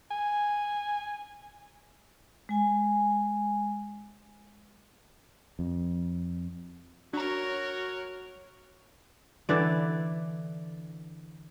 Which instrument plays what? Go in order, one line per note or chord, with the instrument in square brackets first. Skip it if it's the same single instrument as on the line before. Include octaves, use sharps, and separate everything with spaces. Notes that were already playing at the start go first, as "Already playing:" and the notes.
[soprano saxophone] G#5
[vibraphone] G#3 G#5
[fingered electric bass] F2
[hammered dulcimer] F#3 [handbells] D4 A#5 [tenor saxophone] F#4 [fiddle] A#4 C#5
[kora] D3 E3 D5